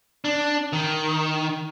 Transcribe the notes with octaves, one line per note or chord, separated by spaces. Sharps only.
D4
D#3